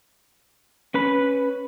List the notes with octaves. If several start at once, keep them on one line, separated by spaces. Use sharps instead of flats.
C#4 B4 B5